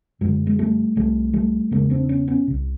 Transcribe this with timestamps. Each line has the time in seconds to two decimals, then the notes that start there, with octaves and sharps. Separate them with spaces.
0.21 F#2 D3 F#3 G#3
0.47 G#3
0.59 G3 A3
0.96 C2 C3 G3 A3
1.33 G3 A3
1.71 E2 C#3 G#3 A#3
1.90 C4 D4
2.09 B3 C#4
2.28 B3 C#4
2.47 C2 C3